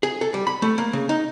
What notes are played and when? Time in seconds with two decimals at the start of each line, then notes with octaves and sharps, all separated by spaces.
0.03 G#4
0.21 A4
0.34 G3
0.47 B5
0.62 A3
0.78 A#3
0.93 C#3
1.09 D#4